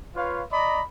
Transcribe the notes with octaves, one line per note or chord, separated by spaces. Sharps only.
F4 B4 C#5 F5
D5 D#5 A#5 B5